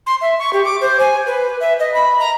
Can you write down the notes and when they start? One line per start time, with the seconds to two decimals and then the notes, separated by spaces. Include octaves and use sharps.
0.07 C6
0.21 E5
0.39 C#6
0.53 G4
0.65 D6
0.81 C5
1.00 G#5
1.27 B4
1.60 E5
1.79 D#5
1.94 B5
2.19 A#5